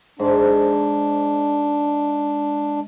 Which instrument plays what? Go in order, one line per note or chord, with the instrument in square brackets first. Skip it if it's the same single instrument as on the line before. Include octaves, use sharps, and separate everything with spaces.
[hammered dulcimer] G#2 [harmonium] D4